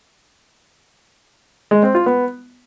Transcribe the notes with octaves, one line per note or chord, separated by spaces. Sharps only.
G#3
C4
F4
B3